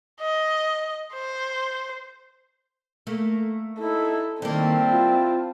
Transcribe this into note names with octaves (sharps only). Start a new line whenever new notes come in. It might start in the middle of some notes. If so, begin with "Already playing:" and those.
D#5
C5
A3 A#3
D#4 E4 A4
D#3 G3 A#3 C4 E4 A5
F4